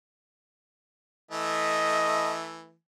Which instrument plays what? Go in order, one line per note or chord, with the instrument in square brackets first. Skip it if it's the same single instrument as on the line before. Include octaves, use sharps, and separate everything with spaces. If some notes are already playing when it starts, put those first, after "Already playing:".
[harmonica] E3 A3 [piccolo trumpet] D#5